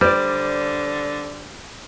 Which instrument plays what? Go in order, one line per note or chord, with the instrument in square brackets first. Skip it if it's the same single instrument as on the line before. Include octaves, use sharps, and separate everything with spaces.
[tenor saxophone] D3 [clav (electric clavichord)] G3 [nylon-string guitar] C5 D5